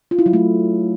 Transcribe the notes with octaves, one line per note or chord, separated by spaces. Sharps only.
F4
E4
F#3
A3